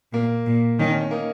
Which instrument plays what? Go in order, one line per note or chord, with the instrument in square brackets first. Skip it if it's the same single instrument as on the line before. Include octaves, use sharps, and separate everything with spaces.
[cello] A#2 [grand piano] A#3
[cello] A#2
[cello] D#3 [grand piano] C#4
[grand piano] C#4
C#4
A#3 D#4